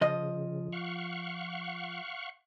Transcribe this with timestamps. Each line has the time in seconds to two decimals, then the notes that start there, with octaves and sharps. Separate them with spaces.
0.01 C#3 F3 D#5
0.73 F5 F#5 C#6